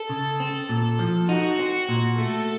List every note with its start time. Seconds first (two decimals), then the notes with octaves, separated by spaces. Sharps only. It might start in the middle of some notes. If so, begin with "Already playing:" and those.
Already playing: A4
0.10 C#3
0.40 C4
0.69 A#2
0.99 F3
1.29 D#4 F#4
1.59 C4
1.89 A#2
2.18 A3 A4